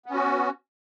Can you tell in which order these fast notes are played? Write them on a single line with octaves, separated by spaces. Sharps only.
B3 C#4 F#4